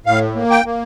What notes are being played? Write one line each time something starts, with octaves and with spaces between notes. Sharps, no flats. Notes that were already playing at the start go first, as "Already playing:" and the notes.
A2 F5
A#3
G5
A#3